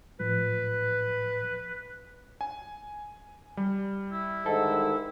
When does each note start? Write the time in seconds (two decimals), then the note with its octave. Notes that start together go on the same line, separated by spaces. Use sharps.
0.20 A2 F3 B4
2.41 G#5
3.57 G3
4.12 E4
4.46 G#2 D3 D#3 A4